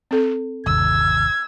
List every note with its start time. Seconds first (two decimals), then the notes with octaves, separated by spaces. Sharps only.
0.11 C4 A4
0.66 G1 D#2 C3 E6 G#6